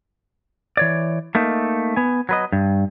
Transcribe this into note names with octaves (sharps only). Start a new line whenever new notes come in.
E3 C#5 D5
A3 A#3 D#4
B3 G#5
F#3 B4 D#5
G2